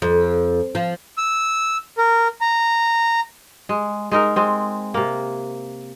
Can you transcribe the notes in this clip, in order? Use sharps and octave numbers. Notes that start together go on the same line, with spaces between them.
F2
F3
E6
A#4
A#5
G#3
G#3 D#4 A#4
G#3 C4
C3 A#3